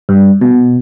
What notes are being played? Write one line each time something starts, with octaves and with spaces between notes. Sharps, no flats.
G2
B2